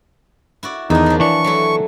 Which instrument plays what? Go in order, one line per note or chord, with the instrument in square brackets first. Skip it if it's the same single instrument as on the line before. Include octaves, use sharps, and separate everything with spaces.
[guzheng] E4 F#4 D5
[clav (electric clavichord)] E2 [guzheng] D#3 D4 [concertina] D#4
[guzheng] F3 F#3
[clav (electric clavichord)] E3 D4 [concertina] C#6
[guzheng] F#3 A3 E4